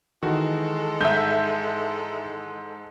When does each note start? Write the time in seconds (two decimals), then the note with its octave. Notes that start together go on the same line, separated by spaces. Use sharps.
0.23 D#3 E3 G#3 D#4 F#4 A4
1.01 G#2 E5 G6